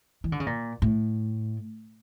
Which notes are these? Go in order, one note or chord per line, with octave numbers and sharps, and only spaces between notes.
E3
D3
C#3
A#2
A2